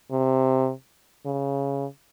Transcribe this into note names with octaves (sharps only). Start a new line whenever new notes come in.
C3
C#3